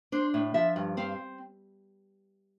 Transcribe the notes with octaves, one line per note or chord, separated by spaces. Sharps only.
D4 C5
A2
F3 E5
G2
C4 F5